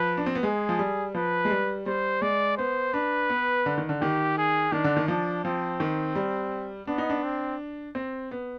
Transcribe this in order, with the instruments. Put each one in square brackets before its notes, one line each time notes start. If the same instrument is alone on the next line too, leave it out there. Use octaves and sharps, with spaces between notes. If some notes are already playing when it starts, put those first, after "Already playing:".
Already playing: [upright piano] F3 [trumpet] B4
[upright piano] D4
C4
B3
[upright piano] G#3 [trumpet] G#4
[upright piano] F3
G3
[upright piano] F3 [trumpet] B4
[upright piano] G#3
G3
[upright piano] G3 [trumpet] C5
[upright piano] G#3 [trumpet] D5
[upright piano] B3 [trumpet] C5
[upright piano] D4 [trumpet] B4
[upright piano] B3
D3
D#3
D3
[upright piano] D#3 [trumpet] G4
[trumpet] G#4
[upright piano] D#3 [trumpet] D4
[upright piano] D3
D#3
[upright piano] F3 [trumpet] D4
[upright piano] F3 [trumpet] C4
[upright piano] D#3
G3
[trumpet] B3 [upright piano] D4
[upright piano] D#4
D4
[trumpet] C4
[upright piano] C4
B3